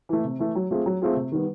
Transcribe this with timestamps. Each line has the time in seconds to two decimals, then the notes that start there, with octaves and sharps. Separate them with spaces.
0.09 E3 A3
0.24 C3
0.39 E3 A3
0.55 F#3
0.71 A3 C4 F4 G#4
0.86 F#3
1.01 A3 C4 F4 G#4
1.17 C3
1.32 D#3 G3 B3